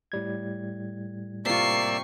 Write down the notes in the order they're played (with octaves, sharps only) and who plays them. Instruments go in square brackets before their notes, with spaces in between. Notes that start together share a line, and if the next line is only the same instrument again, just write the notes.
[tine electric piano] A2 G3 G#6
[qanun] C3 F4 [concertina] A#3 D5 E6 [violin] C#6 C7